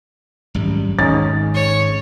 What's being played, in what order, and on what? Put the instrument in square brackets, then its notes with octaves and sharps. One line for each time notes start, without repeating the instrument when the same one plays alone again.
[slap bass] G#1 F#2 G3
[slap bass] G#1 [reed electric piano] C#4 D#4 G#4 [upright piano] A6
[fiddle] C#5